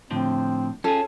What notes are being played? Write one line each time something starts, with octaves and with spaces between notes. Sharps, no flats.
A2 D3 F3 C4
C#4 F4 G#4 A4